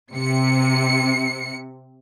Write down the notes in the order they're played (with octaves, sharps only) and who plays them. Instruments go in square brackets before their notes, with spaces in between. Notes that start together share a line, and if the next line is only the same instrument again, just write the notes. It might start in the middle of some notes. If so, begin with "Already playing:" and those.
[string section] C3 C#7